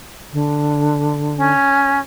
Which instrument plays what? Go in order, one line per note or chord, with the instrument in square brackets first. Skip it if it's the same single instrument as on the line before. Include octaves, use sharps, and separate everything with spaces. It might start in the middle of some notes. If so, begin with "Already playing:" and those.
[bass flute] D3
[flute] C#4